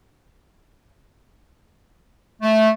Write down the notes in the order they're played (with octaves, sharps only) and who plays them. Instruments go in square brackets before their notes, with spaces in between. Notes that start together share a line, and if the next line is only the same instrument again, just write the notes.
[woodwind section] A3